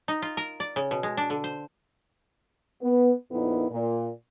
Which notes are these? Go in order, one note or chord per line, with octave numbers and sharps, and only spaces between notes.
D#4
F4
A#4
D5
C#3
B2
G#3
D4
D3
C5
B3
F2 A#2 B3 D#4 E4
A#2